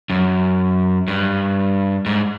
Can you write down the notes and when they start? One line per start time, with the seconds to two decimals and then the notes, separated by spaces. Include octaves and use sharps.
0.10 F#2
1.08 G2
2.06 G#2